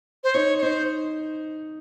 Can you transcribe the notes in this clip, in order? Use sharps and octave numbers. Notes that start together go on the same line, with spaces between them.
C5
D#4 C#5
C#5
D#4 C5